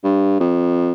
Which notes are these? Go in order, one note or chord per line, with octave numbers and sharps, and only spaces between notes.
G2
F2